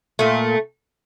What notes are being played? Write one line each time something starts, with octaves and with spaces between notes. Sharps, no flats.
A#2 A3